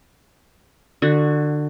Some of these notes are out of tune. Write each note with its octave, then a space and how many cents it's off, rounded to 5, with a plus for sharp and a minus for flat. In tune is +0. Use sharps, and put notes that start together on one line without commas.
D3 +25 F#4 -5